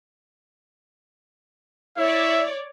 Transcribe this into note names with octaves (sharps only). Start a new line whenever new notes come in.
E4 C#5 D5 E5